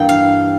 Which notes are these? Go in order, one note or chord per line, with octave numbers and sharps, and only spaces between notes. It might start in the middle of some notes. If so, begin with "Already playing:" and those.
Already playing: G2 E3 A#3 G5
F5